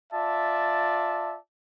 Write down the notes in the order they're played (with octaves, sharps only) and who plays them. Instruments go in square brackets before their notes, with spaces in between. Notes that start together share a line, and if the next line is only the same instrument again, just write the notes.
[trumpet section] F4 D5 E5 A5